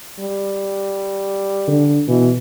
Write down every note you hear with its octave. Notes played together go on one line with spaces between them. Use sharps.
G3
D3
B2 E3